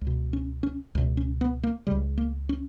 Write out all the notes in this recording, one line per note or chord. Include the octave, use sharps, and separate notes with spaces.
C#2
B2
C#4
C#4
C#2 B2
C#4
B3
A#3
C#2 C#3 G3
A#3
C#4